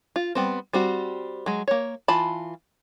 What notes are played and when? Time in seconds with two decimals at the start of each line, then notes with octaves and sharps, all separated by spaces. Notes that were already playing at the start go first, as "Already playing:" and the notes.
0.16 F4
0.35 G3 B3 C4
0.73 G3 C4 F#4
1.46 F#3 G#3
1.68 A#3 C#5
2.08 E3 F4 A5 B5